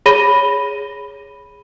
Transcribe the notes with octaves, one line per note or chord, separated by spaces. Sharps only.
G#4 C#5 B5 A#6 D#7 G7